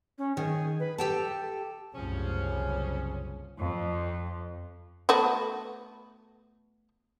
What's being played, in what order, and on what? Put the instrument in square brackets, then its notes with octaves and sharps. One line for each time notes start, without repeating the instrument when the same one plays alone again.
[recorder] C#4
[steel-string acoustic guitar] D#3 [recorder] G#4
[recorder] B4
[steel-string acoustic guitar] G4 G5 A5 [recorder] A4
[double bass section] F#1 A2 [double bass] C2 [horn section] F3 C#4 G#4
[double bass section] F#1
[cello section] F2
[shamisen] A3 B3 F#4